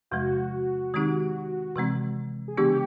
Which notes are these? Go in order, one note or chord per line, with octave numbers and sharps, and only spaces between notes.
E2 C3 F3 G#3 F#4
D#3 G#3 C4 D#4 G4
C3 E3 G#3 C4
G#4
C#3 E3 G#3 B3 D4 G4